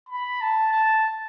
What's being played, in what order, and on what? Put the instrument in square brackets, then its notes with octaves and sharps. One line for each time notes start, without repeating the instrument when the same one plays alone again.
[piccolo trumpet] B5
A5
A5